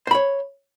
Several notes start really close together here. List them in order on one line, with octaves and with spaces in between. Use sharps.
C5 B5 C#5